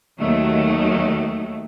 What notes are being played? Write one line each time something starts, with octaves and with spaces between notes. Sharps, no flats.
D#2 D#3 F#3 A3